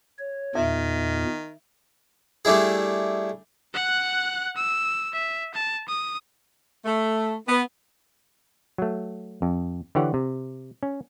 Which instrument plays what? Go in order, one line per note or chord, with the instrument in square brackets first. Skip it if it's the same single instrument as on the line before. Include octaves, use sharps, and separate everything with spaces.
[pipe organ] C#5
[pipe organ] E2 A#2 [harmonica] D#3 [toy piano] E5
[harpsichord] G3 A3 D4 E4 G#4
[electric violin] F#5 F#6
E6
E5
A5
D#6
[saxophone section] A3
B3
[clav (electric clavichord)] F#3 A3
F2
D3 E3 G4 C#5 F#5
C3
C#4